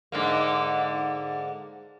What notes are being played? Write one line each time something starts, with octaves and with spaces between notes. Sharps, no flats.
G#2 D3 A#3